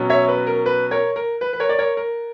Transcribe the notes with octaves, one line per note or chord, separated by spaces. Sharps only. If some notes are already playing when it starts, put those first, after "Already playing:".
Already playing: B2 F#3 C#4
C#5 E5
B4
A#4
B4
A#4 C#5
A#4
B4
B4
A#4 C#5
D5
A#4 C#5
A#4